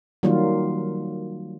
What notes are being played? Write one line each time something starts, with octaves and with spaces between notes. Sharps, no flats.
D#3 F#3 G3 A#3 F4